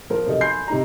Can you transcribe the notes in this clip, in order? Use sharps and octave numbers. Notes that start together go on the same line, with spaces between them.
F3 A#4
B1 C3 A4 D#5
G#5 B5 C6 G6 C7
C3 D#4 A#5